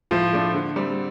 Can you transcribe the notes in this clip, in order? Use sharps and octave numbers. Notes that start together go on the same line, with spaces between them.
A2 F3
A3 D4
D3
G3 C4